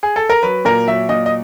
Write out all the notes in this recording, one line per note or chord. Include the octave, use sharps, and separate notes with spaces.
G#4
A4
A#4
F#3 B4
A#2 A#4
F#3 E5
A#2 D#5
D#5